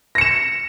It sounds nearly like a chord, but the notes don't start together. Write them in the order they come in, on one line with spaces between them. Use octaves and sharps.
A#6 C#7 E7